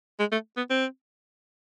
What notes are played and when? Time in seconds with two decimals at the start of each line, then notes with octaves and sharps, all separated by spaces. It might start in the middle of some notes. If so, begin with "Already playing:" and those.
0.19 G#3
0.32 A3
0.57 B3
0.70 C4